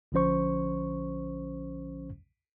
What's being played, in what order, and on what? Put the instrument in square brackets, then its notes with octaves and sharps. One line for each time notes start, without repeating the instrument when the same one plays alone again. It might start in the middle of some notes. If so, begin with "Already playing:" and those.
[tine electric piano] A#1 D3 F3 C#4 C5 C#6